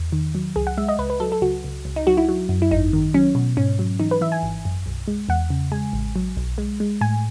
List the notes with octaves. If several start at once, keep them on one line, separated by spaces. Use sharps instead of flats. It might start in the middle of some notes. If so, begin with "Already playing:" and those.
Already playing: E2
D#3
F#3
C#2 G#4
F#5
G#3 E5
D#5
C#2 B4
B4
F#3 A4
A4
C#2 F#4
C#2
C#2
D#4
F#3 F#4
E4
F#3
F#2
E4
G#1 D#4
D#3
F#3 C#4
B2
G#2 C#4
F#3
E3 D#4
B4
E3 E5
G#5
G#1
F#2
B1
G#3
E2 F#5
C#3
G#3 G#5
A1
F#3
B1
G#3
G#3
A2 G#5